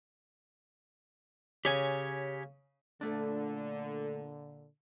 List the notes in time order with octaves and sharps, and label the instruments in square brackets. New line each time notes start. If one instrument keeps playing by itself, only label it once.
[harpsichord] C#3 [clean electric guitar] G4 C#5 G#5
[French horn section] A#2 D3 [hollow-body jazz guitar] A3 D4